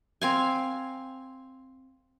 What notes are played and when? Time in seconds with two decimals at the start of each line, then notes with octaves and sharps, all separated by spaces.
0.21 C4 F5 G#5